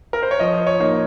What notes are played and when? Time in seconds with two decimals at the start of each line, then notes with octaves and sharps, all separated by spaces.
0.13 A#4
0.23 C5
0.31 C#5
0.39 F3 D#5
0.67 C#5
0.80 A#3 D#4